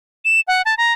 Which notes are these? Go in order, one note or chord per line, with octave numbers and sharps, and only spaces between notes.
E7
F#5
A5
A#5